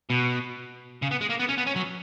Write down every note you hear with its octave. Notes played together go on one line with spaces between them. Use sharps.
B2
C#3
B3
G#3
A#3
B3
C#4
B3
C#4
F#3